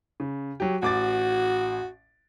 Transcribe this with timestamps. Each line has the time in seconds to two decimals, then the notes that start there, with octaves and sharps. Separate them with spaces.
0.20 C#3
0.60 F#3 G4
0.82 A1 F#4 D6 A6